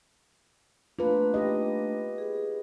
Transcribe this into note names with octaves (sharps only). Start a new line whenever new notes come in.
A3 A#3 D4 F4 B4
G4 D#5
G#4